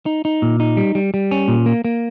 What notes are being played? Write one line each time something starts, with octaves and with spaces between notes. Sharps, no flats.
D#4
D#4
A#2
D#4
G3
G3
G3
C#4
A#2
A#3
A#3